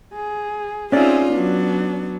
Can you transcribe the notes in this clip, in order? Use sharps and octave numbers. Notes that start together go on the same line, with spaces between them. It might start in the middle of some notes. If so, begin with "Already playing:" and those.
G#4
C4 C#4 D#4 F4 G#4 D5 E5
F#3 B3 D4